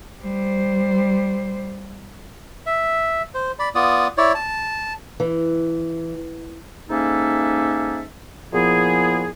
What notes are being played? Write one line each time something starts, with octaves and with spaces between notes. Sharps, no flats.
G3 C5
E5
C5
D5 B5
B3 F4 D5 D#6
E4 C#5 D5
A5
E3
G#2 A#3 C#4 D#4 A4 E5
A#2 F3 B3 E4 G#4